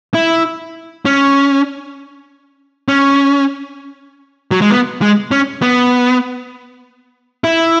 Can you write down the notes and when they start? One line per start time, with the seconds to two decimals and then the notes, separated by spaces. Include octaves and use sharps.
0.14 E4
1.05 C#4
2.88 C#4
4.51 F#3
4.61 G#3
4.70 B3
5.02 G#3
5.31 C#4
5.62 B3
7.44 E4